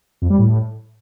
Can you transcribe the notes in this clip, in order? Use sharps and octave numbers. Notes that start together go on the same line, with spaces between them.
F2
G3
A2